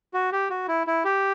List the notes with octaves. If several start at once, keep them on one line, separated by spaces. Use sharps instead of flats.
F#4
G4
F#4
E4
E4
G4